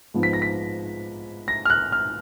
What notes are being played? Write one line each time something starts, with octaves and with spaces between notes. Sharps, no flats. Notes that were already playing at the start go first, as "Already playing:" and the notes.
G#2 F3 B3
B6
A#6
B6
A#6
F6
F#6
F6